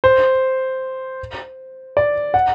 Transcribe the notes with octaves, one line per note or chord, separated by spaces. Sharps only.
C5
D5
F#5